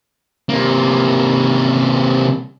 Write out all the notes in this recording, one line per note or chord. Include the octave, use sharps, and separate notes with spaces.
C3 A#3